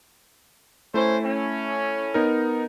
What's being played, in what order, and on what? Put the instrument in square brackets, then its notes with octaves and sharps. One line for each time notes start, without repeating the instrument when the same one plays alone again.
[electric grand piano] A3 E4 [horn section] C#4 C5
[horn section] C#4
[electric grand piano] B3 D#4 A#4